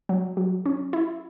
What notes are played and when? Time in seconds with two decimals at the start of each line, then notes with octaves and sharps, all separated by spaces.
0.09 F#3
0.37 F#3
0.66 C#4
0.93 E4